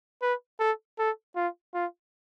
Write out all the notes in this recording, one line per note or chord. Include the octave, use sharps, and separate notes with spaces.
B4
A4
A4
F4
F4